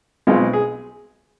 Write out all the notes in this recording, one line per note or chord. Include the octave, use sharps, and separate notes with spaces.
B1 B2 G#3 C4 F4
G#4